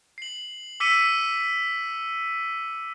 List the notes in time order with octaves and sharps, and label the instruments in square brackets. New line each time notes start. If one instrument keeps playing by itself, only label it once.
[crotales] C7 F#7
D6 E6 B6 C#7 D#7